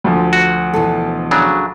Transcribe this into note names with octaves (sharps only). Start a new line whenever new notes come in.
D2 F3
F#4
B2 E3 A4
C#3 F#3 D4